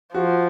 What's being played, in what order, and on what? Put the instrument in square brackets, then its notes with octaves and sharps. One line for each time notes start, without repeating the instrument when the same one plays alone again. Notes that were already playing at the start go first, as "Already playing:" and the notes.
[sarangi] F3 [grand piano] F#4